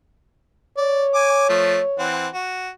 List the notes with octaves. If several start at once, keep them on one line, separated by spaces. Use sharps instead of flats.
C#5 D5
G#5 D6
F3 A3
E3 C4 F#5
F#4